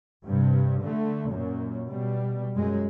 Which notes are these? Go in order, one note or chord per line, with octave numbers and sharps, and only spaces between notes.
G2 C3
D3 A3
F#2 A#2
B2 G3
F#2 G#3